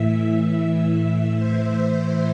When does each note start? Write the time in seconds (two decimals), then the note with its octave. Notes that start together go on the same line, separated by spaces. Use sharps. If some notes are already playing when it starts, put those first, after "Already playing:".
Already playing: A2 E3 E5
0.52 E5
1.36 C5